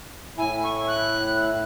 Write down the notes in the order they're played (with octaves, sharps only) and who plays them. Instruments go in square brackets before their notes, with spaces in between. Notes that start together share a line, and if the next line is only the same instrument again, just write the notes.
[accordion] A2 E4 [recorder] G#5
[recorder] C#6
F#6